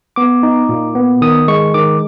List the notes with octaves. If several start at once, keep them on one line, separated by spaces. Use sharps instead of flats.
B3 D6
D#4
A#2
B3
D#3 D#6
G#3 C#6
D#3 D6